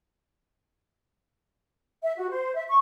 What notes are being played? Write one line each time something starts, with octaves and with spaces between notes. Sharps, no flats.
E5
F#4
C5
E5
C#6